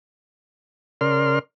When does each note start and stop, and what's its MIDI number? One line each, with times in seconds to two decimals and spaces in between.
1.01 1.39 49
1.01 1.39 70
1.01 1.39 74
1.01 1.39 84
1.01 1.39 89